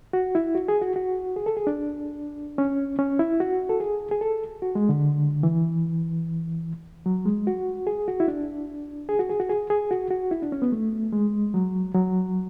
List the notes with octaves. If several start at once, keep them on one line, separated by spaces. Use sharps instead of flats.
F#4
E4
F#4
G#4
F#4
F#4
G#4
A4
G#4
D4
C#4
C#4
E4
F#4
A4
G#4
G#4
A4
F#4
G#3
D3
E3
F#3
G#3
F#4
G#4
F#4
E4
D4
G#4
F#4
G#4
F#4
G#4
G#4
F#4
F#4
E4
D4
C#4
B3
A3
G#3
F#3
F#3